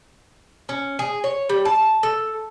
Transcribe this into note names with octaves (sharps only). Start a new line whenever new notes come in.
C#4
G#4
C#5
G3
A5
A4